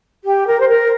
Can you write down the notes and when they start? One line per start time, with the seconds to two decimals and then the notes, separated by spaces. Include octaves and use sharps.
0.24 G4
0.47 A#4
0.60 C5
0.68 A#4